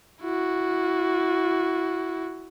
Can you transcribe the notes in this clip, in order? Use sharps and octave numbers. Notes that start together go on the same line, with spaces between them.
E4 F#4